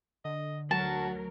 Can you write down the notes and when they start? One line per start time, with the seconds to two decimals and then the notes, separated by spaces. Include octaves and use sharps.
0.25 D3 D#5
0.71 D2 F#3 F#4 A#4 A5